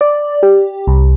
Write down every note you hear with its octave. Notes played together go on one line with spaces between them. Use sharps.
D5
G4
C2